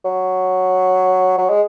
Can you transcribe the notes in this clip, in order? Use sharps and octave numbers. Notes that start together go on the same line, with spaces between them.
F#3
F#3
G#3